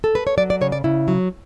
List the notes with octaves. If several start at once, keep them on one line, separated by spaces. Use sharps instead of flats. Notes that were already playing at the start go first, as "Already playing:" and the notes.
A4
B4
C#5
F#3 D5
D5
C#3 C#5
D5
C#3 E4
F#3